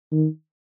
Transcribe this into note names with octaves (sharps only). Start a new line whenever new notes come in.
D#3